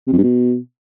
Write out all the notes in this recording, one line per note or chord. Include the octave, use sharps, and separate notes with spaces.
C3
F2
G2
B2